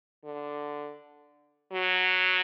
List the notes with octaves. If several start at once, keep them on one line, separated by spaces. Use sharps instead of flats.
D3
F#3